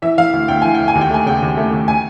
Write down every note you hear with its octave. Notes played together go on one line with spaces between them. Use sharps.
E3 E5
E3 F5
D2
D2 G5
E3 G#5
G5
D2
G#5
D#2
G5
A3 G#5
C#3 G5
D#2
A3
D#2
G#5